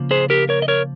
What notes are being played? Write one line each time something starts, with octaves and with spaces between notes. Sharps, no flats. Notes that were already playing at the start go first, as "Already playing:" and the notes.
Already playing: C#3 F3 A#3
G#4 C5
G4 A#4
A#4 C#5
D#5
A#4 C#5